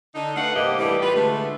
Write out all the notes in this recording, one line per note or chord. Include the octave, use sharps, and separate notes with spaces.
D3 D#4
A3 B4 F5 F#5
G2 C3 A#3 G4 D#5
A2 E3 G3 G4 B4
F4 G4 B4
D3 G#3 A3